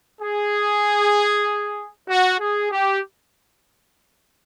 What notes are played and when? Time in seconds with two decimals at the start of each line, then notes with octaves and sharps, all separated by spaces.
0.22 G#4
2.09 F#4
2.40 G#4
2.72 G4